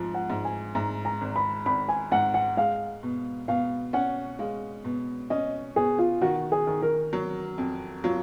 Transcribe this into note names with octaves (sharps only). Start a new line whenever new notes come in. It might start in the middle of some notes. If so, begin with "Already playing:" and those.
Already playing: G#2 F3
F#5
G#2
G#5
G#2 A#5
A#5
G#1
B5
G#1 B5
G#5
G#2 F#5
F#5
G#3 F5
B2
B2 F5
C#4 F#5
G#3 F5
B2
C#4 D#5
B2 G#4
F4
D#3 F#4
G#4
D#3
A#4
F#3
F2
F#3 F4